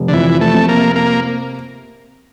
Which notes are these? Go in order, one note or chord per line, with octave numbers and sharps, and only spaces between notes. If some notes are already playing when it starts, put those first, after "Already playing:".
Already playing: F1
D3
F2 E3
A3
C3
A#3
A#3